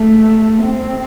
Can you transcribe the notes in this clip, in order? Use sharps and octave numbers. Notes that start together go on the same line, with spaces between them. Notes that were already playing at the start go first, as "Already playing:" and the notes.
Already playing: A3
C4